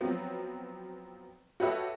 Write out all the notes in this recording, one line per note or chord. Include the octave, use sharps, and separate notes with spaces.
F3 F#3 B3 C4
F#4 G4 A4 B4 C#5 E5